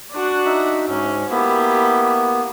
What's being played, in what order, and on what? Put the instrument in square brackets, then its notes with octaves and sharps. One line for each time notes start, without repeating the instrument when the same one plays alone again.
[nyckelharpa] D4 F#4
[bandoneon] D#4 E5
[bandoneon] G#2 [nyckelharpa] C#4
[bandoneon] A#3 B3 [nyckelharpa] E4 G4